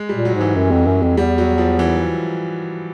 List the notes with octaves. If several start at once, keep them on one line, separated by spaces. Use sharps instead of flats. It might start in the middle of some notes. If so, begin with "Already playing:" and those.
Already playing: G#3
G3
A#2
F#3
G#2
E3
F#2
F2
F#2
F2
E2 G3
F#3
F3
E3